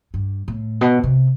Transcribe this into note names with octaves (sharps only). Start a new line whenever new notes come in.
G2
A2
B2
C3